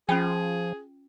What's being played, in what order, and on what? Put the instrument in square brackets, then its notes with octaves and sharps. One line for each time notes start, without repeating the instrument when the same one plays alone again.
[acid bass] F3 [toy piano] C#4 F4 G5 [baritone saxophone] G#4